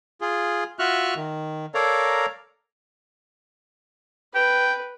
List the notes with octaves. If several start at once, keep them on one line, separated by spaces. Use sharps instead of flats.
F4 G#4
F4 F#4 E5 C#6 F6 F#6
D#3
A4 A#4 C#5 D5 F5 A#5
B4 G5